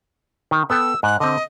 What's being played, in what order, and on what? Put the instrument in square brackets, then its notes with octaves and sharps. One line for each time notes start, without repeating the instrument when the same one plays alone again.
[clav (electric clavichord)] D#3
[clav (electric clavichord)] B3 A4 G5 [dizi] E6
[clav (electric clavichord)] G#2 [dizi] F#6
[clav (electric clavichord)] D3 C4 [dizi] D#5